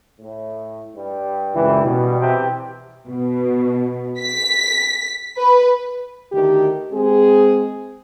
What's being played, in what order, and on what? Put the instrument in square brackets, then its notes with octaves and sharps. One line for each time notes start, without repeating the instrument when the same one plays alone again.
[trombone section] A2
G2 G3
[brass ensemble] C#2 F#2 E3
B2
[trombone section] C3 E3 G4
[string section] B2
B6
B4
[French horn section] D2 D#3 G4
G#3 C4 G#4